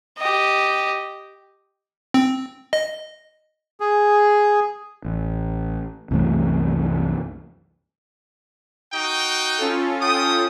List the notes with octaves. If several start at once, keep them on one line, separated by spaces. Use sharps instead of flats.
G4 D#5
C4
D#5
G#4
A1
C2 F#2 E3 A3
D#4 F#4 G5
C#4 F4 A4
G5 D#6